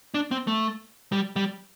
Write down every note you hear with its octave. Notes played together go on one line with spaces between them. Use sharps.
D4
C4
A3
G3
G3